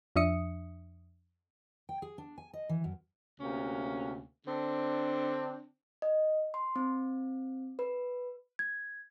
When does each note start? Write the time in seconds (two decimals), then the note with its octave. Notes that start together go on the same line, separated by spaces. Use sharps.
0.16 F2 F3 D4 E5 D#6 C#7
1.89 G5
2.02 G#4
2.18 D4
2.38 G#5
2.53 D#5
2.69 E3
2.84 F#2
3.40 D2 C3 A#3 C#4
4.47 D3 C4 D4
6.02 D#5
6.54 C6
6.76 C4
7.79 B4
8.59 G#6